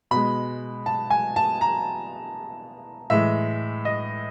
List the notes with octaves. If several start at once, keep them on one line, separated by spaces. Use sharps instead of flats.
B2 G#3 B5
A5
G#5
A5
A#5
A2 E3 G#3 E5
D#5